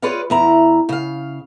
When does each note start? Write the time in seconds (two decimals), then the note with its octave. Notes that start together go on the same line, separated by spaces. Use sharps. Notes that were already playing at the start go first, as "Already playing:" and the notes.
0.02 F4 G#4 B4 C#5 D5 F5
0.30 E2 E4 A#5
0.89 C#3 F5